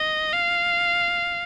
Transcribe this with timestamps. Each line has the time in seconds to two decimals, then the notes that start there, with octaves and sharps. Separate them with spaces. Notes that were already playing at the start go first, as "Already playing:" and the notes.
Already playing: D#5
0.34 F5